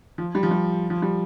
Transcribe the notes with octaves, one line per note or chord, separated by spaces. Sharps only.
F3
G3
F3
G3
F3
G3